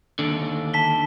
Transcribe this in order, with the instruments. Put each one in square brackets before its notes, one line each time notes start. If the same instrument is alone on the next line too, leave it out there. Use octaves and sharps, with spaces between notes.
[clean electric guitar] D#2 D3
[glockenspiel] A5 B6 G7